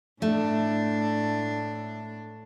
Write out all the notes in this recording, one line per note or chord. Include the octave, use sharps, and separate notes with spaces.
A2 A3 D4